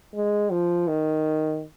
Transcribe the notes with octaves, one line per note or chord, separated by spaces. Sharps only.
G#3
F3
D#3